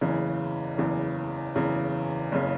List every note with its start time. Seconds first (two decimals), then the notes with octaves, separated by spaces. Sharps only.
0.01 F#1 E2 C#3 E3
0.78 F#1 E2 C#3 E3
1.55 F#1 E2 C#3 E3
2.32 F#1 C#3 E3